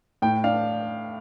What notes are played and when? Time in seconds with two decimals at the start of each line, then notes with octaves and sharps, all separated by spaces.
0.22 A2 G5
0.44 D4 F5